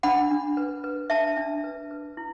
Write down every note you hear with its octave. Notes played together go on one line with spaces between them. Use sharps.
D4 F#5 B5
D4
B4
B4
D4 E5 A5
D4
B4
B4
E4